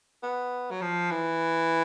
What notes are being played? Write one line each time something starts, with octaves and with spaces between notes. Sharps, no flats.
B3
F#3
F3
E3